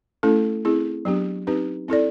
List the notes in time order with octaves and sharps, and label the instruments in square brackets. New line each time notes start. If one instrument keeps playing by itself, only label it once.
[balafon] A3 C#4 E4 A4
C4 E4 G#4
F#3 B3 D4 G4
C4 D#4 G4 B4
C4 E4 A4 D5